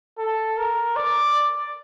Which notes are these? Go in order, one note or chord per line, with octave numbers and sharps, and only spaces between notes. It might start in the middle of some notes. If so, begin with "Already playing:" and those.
A4
A#4
D5